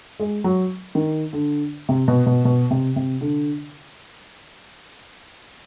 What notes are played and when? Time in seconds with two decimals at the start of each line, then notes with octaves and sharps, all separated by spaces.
0.20 G#3
0.44 F#3
0.95 D#3
1.33 D3
1.89 C3
2.08 B2
2.26 B2
2.45 B2
2.71 C3
2.96 C3
3.21 D3